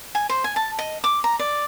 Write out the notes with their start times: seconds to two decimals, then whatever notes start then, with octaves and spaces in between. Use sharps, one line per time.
0.15 G#5
0.29 C5
0.44 G#5
0.56 A5
0.79 D#5
1.04 D6
1.24 A#5
1.39 D5